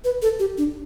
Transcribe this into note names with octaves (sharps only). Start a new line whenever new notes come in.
B4
A4
G4
D4